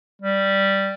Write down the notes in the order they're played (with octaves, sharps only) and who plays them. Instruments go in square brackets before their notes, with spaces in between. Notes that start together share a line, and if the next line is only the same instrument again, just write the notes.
[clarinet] G3